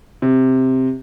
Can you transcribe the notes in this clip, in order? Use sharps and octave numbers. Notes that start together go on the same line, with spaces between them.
C3